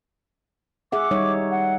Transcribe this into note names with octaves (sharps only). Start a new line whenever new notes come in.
G#4 E5 F#5 D6
G3 D#4 C#5
F#5